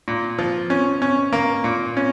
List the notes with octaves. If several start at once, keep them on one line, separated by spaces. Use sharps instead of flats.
A#2
F3
C#4
C#4
A#3
A#2
C#4